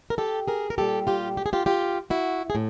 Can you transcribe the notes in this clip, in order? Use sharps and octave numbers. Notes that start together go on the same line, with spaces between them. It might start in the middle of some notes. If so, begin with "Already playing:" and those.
A#4
G4 A4
G#4 A#4
A#4
A#2 G3 G4 A4
F4 G4
G4
G#4
F4 G4
F4 G4
E4 F#4
G#4
A2